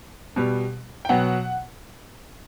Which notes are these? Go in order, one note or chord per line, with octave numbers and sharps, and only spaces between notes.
B2 G3 B3
G5
B2 F#3 B3 F#5